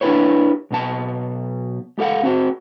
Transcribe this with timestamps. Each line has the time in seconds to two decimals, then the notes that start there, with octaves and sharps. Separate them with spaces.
0.01 D4 E4 F#4 G4 B4 C#5
0.71 B1 B2 A5
1.98 G#3 G4 A4 F5 F#5
2.23 C4 F#4 C5